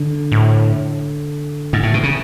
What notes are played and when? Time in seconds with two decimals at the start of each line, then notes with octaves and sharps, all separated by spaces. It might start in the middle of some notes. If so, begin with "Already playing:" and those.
Already playing: D3
0.32 A2
1.73 G#2
1.83 A2
1.94 B2
2.03 C#3